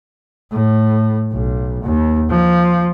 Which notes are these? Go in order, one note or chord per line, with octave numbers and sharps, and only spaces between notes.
A2
B1
D#2
F3